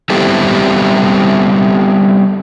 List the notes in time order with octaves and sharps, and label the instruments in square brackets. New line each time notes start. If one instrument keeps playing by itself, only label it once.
[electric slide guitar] G3 B3 C4 E4 G4 A4